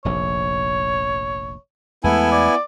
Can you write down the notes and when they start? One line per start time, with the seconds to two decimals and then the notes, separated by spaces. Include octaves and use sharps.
0.05 F1 A#1 C#5
2.04 E2 G#3 A3 B3 E4 A4 G#5
2.32 D5